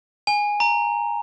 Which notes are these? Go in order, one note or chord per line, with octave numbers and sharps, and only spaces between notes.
G#5
A#5